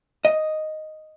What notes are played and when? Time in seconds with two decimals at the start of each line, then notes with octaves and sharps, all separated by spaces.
0.25 D#5